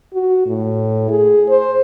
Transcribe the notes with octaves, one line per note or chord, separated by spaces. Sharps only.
F#4
A2
G#4
C5